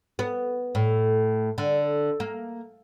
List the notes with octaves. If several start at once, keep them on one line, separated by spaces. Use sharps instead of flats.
B3
A2
D3
A#3